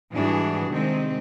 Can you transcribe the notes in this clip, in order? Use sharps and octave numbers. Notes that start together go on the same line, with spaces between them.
G#2 E3 G3 D4 F#4 G#4
C3 D#3 G#3 C4